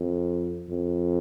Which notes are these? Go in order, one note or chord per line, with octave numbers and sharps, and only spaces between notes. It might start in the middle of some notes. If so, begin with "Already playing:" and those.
Already playing: F2
F2